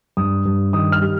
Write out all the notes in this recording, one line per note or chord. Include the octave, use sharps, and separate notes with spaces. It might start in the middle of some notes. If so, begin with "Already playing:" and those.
G2 D#6
G2
D#3 D#6
F6
G3